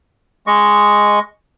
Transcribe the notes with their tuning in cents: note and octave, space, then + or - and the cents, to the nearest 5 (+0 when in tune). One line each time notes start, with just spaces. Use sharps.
G#3 +0 D#5 +0 C#6 +0